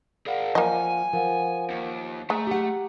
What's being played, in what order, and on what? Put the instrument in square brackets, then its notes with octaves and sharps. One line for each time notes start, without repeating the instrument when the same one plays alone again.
[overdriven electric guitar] G#4 A#4 [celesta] D5 F5 F#5
[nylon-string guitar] F3 [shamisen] A#3 D#5 [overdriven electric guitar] G#5
[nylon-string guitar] F3 [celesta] A#4 F5 F#5
[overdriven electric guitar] D#2
[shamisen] G#3 [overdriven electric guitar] A3 [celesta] A#5
[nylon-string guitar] G4 F#5